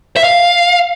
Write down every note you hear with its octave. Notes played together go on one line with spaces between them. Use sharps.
E5
F5